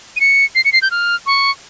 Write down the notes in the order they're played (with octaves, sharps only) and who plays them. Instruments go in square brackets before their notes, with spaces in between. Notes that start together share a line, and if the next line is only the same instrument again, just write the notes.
[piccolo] D#7
C#7
C7
C#7
C7
G6
F6
C#6